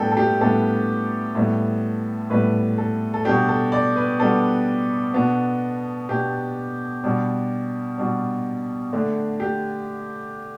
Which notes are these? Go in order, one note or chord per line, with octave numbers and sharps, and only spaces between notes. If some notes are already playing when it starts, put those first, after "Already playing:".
Already playing: A2 G3 B3 D4 A4 G5
A4
G4
A2 G3 B3 D4 A4
A2 G3 B3
A2 G3 B3 B4
A4
A4
B2 G3 B3 D4 G4
A4
D5
B4
B2 G3 B3 D4 A4
B2 B3 D4
B2 B3 D4 G4
B2 G3 D4
B2 G3 D4
D3 A3 D4
G4